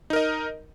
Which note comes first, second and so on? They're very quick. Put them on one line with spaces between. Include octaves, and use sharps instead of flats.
D#4 A#4 D#5